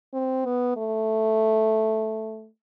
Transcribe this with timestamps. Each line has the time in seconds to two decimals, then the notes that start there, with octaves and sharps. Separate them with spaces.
0.14 C4
0.45 B3
0.77 A3